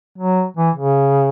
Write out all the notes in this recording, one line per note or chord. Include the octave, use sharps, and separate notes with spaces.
F#3
E3
C#3